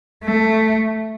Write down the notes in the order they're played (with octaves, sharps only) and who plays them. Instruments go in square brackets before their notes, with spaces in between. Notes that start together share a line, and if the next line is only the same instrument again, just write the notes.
[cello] A3